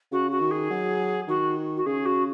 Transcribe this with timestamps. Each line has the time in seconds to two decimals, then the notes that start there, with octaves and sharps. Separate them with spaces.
0.12 C#3 F#4
0.31 F#4
0.40 D#3
0.51 G#4
0.70 F#3
1.28 D#3 F#4
1.76 F#4
1.86 C#3 G#4
2.05 F#4